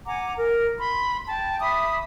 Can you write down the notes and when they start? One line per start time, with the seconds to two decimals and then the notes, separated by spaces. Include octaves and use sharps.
0.06 F#5 G#5 A#5 D6
0.37 A#4
0.79 B5 C6
1.28 G5 A5
1.60 E5 B5 D6 D#6